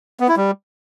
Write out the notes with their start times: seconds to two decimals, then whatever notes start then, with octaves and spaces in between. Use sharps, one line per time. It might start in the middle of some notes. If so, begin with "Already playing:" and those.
0.20 B3
0.28 E4
0.37 G3